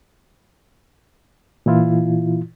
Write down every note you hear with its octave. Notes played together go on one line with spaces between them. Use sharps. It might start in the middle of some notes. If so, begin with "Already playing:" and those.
A#2 E3 E4 F4